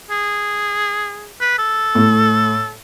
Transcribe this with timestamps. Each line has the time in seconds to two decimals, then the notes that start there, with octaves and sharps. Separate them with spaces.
0.10 G#4
1.41 B4
1.58 A4
1.95 A2 A3